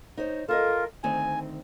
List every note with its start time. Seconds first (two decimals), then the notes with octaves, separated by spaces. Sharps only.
0.17 D#4 C5 C#5
0.49 F4 A4 A#4 D#5
1.04 D2 D#3 C4 G#5